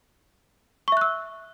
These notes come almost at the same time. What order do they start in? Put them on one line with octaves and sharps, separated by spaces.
C#6 E5 F#6 E6